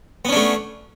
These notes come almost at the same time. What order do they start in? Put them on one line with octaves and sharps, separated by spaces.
B3 C#4 D4 A3